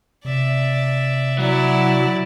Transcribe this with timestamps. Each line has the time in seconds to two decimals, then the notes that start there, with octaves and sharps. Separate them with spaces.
0.25 C3 D5 E5
1.38 F#3 E4 D5